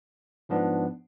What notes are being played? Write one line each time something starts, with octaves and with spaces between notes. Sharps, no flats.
G#2 F3 B3 D4